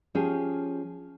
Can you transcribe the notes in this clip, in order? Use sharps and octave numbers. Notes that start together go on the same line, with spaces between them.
F3 C#4 G4 G#4